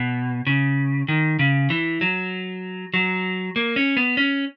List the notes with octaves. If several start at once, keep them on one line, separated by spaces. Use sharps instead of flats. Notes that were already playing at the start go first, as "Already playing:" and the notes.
Already playing: B2
C#3
D#3
C#3
E3
F#3
F#3
A#3
C#4
B3
C#4